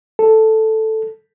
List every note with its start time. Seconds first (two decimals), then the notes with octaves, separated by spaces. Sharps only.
0.19 A4